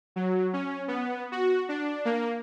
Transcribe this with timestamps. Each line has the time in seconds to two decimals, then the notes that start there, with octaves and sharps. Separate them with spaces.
0.16 F#3
0.53 C#4
0.88 B3
1.32 F#4
1.69 D4
2.05 A#3